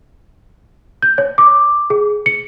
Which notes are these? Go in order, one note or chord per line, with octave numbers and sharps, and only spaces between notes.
G6
C#5
D6
G#4
C#7